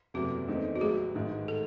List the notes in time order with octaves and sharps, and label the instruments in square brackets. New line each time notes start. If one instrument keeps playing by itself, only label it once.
[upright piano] F#1 E2 C3 F#3 A3 [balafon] F#4
[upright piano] E2 D#3 A3 C4 D#4
[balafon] F#4
[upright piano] A1 A2 F#3 [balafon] G#4
[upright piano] A1 G#2 D#3 G#3
[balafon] A4